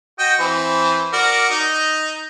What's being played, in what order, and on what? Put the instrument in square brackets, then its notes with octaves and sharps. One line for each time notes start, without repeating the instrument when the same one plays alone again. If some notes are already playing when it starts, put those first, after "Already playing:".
[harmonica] F#4 D#5 G5
E3 C4
F#4 A#4 D5
D#4 D#5